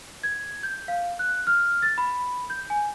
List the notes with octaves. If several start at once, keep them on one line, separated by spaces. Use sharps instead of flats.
G#6
G6
F5
F#6
F6
A6
B5
G6
G#5